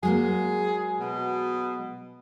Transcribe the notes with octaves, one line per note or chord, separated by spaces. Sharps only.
F#3 G#3 A#3 G#4
B2